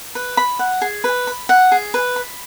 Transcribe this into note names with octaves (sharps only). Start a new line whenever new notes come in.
B4
B5
F#5
G#4
B4
B5
F#5
G#4
B4
B5